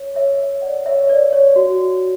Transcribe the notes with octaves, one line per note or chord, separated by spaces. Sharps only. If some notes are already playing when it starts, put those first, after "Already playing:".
Already playing: C#5
C#5 E5
D5 F#5
C#5 E5
C#5
B4 D5
C#5
F#4